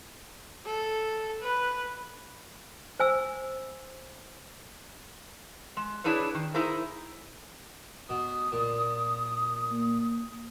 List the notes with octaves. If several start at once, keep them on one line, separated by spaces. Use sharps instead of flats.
A4
B4
C5 G#5 E6
G#3
D4 E4 G#4 B4 C#5
D#3
D#4 E4 G#4 A#4 C5
B2 D#6
A#2
A#3